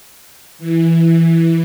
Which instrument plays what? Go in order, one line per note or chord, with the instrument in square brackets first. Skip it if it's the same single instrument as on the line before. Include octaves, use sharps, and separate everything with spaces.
[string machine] E3